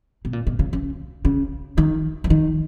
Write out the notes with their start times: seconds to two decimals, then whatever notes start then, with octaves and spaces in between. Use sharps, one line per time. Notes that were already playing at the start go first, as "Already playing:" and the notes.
0.25 B2
0.33 A#2
0.47 B2
0.59 C#3
0.73 C#3
1.25 C#3
1.78 D#3
2.24 E3
2.30 D#3